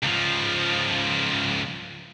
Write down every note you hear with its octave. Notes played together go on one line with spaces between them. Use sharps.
C#2 F3